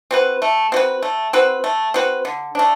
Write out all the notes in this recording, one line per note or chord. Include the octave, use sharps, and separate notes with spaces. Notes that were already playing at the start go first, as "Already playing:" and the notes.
C4 F#4 B4
A3
C4 F#4 B4
A3
C4 F#4 B4
A3
C4 F#4 B4
D3
A3 D4